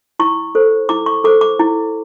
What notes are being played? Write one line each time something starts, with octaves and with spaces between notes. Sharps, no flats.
E4 C#6
A4 C5
E4 D6
C#6
A4 C5 D6
D6
E4